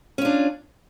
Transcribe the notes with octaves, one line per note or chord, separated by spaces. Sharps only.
C#4 D4 F4